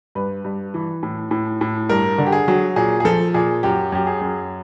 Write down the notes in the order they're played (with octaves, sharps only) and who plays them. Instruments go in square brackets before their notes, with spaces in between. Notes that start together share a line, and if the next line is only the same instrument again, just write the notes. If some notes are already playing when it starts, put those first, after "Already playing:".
[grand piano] G2 B4
G2
E3
A2
A2
A2
G2 A#4
D3
G4
G#4
F#3
A#2 G#4
G#4
F3 A4
A#2 G#4
F#2 G4
F#2 G4
G#4
F#2